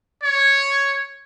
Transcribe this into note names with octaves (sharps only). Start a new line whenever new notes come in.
C#5